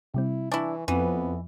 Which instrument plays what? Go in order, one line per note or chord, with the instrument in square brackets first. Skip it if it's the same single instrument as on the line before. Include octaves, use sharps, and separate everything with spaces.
[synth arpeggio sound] C3 G3 C4 [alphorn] E4
[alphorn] E3 [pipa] D4 E4 [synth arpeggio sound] G#5 C#6
[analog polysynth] F2 [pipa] E3 [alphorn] B3